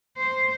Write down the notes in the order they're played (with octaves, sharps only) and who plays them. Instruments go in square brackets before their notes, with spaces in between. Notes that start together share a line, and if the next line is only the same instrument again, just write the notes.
[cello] C5